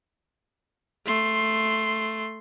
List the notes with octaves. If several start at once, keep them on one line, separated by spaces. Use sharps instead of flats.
A3 C6